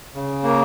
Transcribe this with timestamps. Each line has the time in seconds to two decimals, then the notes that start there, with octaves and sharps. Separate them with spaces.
0.15 C#3
0.44 A#3